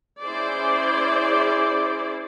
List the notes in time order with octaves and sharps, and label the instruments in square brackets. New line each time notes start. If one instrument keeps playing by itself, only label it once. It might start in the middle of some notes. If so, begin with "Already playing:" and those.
[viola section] C#4 E4 G#4 C5 D5